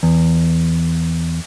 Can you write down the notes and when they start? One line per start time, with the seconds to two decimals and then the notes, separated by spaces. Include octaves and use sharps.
0.03 E2